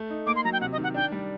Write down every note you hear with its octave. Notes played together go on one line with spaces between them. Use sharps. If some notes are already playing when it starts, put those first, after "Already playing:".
Already playing: A3
D#4
A#3 D6
C6
F#3 A#5
G5
C3 F#5
D#5
D#3
F#5
D4 G5
G3